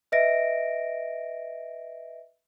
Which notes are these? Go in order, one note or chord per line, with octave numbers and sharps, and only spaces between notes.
B4 D#5 E5 A#6 D7